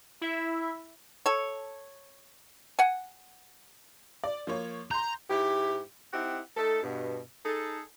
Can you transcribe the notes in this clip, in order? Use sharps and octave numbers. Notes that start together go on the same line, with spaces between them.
E4 E5
A4 C#5
F#5 G#5
D5
F3 A#3 C#5
A#5 C6 G6
G#2 E4 G4
C4 D#4 E4 G4 F#5
A3 D#4 A4
G2 B2
D#4 G#4 A4